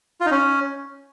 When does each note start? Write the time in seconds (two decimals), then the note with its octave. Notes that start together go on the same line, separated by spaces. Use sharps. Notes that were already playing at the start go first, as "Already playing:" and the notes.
0.21 F4
0.26 D#4
0.31 C#4